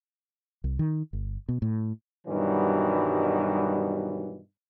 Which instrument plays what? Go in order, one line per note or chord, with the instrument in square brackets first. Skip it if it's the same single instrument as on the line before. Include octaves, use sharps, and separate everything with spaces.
[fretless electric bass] C2
D#3
G1
B2
A2
[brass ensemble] G2 B2 D#3 E3 F#3 G3